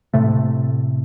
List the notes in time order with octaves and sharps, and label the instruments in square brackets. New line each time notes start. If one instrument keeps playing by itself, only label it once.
[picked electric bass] A2 C3 A3